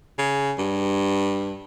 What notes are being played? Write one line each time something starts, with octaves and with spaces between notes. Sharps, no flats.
C#3
G2